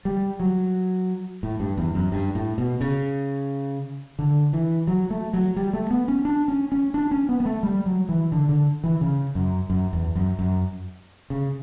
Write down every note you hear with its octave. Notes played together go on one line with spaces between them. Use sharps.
G3
F#3
A2
G2
E2
F#2
G2
A2
B2
C#3
D3
E3
F#3
A3
F#3
G3
A3
B3
C#4
D4
C#4
C#4
D4
C#4
B3
B3
A3
G3
F#3
E3
D3
D3
E3
C#3
F#2
F#2
E2
F#2
F#2
C#3